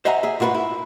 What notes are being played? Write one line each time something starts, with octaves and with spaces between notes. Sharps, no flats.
C5 D#5 E5 F#5 G#5 A#5
G#4 E5
G#2 F4 F#4 A#4 B4
E4